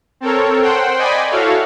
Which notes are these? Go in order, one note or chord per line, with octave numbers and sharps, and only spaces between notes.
C4 A4 A#4 C#5
C5 F#5 G5 C6
D5 D#5 G5 G#5 B5
E4 F#4 A4 C#5 F5